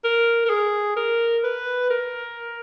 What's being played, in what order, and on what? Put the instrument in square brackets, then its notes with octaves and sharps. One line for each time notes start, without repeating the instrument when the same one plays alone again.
[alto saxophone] A#4
A#4
G#4
A#4
B4
A#4